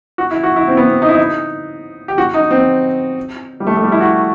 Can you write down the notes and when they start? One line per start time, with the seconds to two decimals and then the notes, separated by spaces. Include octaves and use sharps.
0.18 F#4
0.31 E4
0.43 F#4
0.56 E4
0.68 C4
0.77 B3
0.84 C4
1.02 D#4
1.09 E4
1.16 D#4
2.08 G4
2.18 F#4
2.34 D#4
2.51 C4
3.60 G3
3.67 A3
3.77 A3
3.83 G3
3.92 E4
4.00 F#4